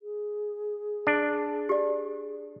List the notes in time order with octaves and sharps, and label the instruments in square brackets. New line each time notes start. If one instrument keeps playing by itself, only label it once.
[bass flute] G#4
[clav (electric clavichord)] D4
[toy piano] G4 D5